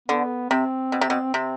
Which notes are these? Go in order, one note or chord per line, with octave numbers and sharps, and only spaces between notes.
D3 B3
C3 C4
B2
C3
B2
C3 C4